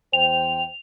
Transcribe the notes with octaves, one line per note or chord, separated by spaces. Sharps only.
E2 C5 G5 F7